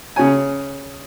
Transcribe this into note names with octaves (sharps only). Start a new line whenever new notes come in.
C#3 C#5 G#5